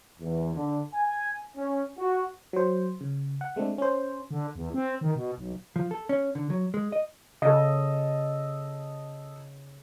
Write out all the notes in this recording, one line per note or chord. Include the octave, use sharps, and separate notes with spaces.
E2
D3
G#5
C#4
F#4
F#3 C5
C#3
F#5
G#3 A3 C4 D4
C#4 C5
D3
E2
C4
D#3
B2
B1
F3
A4
C#4
D3
F#3
G#3
D#5
C#3 A4 D#5